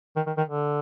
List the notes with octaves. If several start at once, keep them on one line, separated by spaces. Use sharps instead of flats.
D#3
D#3
D#3
D3